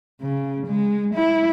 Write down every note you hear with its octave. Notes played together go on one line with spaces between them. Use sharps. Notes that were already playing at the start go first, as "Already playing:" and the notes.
C#3
G#3
E4